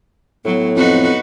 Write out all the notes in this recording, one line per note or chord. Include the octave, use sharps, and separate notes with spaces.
A2 F#3 B3
F2 D#4 F#4 B4